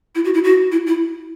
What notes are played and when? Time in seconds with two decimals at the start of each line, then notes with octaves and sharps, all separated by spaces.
0.15 E4
0.25 F#4
0.34 E4
0.44 F#4
0.72 E4
0.87 E4